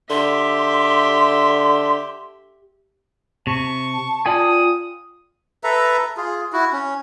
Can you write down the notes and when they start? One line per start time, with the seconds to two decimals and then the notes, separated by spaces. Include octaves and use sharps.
0.10 D3 G4 E5 C6
3.47 C3 A5 C#6
4.26 F4 D5 G5 G#5 D#6
5.64 A4 B4 E5 A#5
6.17 F4 G#4
6.53 E4 F#4
6.73 C#4